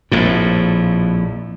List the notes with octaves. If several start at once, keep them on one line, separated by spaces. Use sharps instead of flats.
A#1 F2 A2